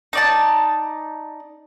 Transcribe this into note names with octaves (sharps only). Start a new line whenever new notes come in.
D#4 D5 A5